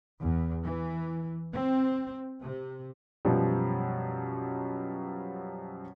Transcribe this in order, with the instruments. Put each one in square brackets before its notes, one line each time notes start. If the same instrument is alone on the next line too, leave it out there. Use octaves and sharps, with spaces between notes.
[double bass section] E2
E3
C4
C3
[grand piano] F#2 B2 F3 G3